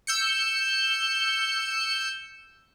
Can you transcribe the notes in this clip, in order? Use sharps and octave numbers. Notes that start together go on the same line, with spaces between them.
E6 G6 C#7